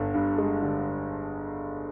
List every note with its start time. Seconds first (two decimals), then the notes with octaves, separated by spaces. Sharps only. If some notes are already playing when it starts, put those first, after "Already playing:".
Already playing: G1 D3
0.14 G2
0.38 G#3
0.62 D3